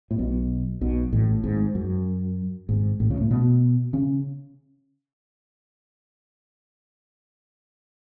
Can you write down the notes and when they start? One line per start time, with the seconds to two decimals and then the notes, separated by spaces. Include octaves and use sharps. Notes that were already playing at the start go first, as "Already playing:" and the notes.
0.11 A2
0.18 B1 B2
0.81 B1 B2
1.12 A1 A2
1.43 G#1 G#2
1.75 F#2
2.69 G#1 G#2
3.00 A1 A2
3.10 C#2 C#3
3.21 A2 A3
3.31 B2 B3
3.93 C#3 C#4